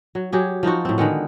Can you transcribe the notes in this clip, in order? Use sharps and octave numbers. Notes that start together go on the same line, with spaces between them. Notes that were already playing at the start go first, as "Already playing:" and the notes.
F#3
F#3 G4 G#4
F3 D#4 F4 F#4
A2 C4
D3 D#3 G#3 B3